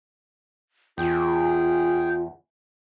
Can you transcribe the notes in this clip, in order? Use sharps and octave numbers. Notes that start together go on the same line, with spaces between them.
E2 F4 G#4 G5